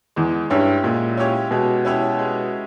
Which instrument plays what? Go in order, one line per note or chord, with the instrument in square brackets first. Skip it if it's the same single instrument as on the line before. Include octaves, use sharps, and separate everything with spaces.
[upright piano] E2 [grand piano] G#3
[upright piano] G2 [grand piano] C#4 E4 G4 C#5
[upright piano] A#2 [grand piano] G#3
[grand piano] C#4 E4 G4 C#5
[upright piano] B2 [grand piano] G#3
[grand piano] C#4 E4 G4 C#5
G#3